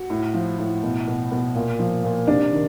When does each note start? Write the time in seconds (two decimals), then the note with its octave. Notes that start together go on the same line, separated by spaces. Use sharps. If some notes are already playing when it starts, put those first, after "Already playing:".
Already playing: F#4
0.10 A2
0.34 F3
0.59 A2
0.83 B2
1.08 B2
1.32 B2
1.55 A#2
1.79 F3
2.04 A#2
2.27 C3 D4
2.52 D#3